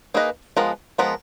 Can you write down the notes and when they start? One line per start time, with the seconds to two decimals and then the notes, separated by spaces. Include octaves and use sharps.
0.14 A#3 D#4 G#4 B4 D#5
0.57 F3 G#3 B3 F4 A#4
0.98 F3 G#3 B3 F4 A#4